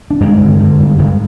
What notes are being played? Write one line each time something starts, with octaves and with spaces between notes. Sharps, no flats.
D4
G2 G#3 C4
D3
D3
G2
G2